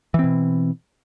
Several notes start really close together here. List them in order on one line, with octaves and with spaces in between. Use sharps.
E3 C4 B2